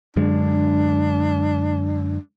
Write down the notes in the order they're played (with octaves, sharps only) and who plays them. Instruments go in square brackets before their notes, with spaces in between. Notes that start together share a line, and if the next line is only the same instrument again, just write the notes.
[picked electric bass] F#2 D3 G#3 [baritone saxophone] D4